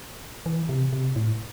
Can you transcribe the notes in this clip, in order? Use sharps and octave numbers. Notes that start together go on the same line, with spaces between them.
E3
C3
C3
A2